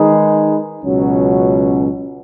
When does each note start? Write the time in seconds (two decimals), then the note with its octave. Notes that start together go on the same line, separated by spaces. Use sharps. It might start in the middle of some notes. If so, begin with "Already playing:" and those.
Already playing: D#3 G#3 D#4 G#4 B4
0.84 C#2 B2 F#3 C#4